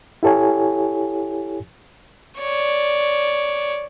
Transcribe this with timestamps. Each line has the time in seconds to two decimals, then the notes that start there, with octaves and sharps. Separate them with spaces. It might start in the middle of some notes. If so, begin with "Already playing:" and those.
0.23 E4 G4 A4 C#5 G#5
2.39 C#5 D5